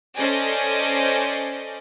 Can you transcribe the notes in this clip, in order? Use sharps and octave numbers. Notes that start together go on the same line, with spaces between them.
C#4 A4 C5 D5 D#5 G#5